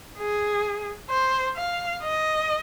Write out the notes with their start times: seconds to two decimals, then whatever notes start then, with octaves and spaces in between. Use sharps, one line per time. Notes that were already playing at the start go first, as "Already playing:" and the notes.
0.18 G#4
1.10 C5
1.57 F5
2.03 D#5